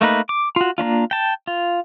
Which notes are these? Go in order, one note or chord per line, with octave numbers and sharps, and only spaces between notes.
A3 A#3 D#4 B4
D6
F4 F#4
A#3 C#4 D4 F4
G5 A5
F4